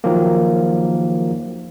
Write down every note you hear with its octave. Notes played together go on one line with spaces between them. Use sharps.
D#3 F3 F#3 A#3